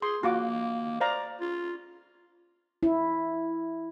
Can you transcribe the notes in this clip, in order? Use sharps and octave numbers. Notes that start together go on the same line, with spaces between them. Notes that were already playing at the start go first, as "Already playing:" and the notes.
G#4 C6
A#3 F4 F#4 D6
C5 D5 F5 A#5
F4
E4